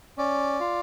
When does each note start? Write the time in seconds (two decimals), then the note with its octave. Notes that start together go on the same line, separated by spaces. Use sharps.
0.18 C#4 D5
0.60 F4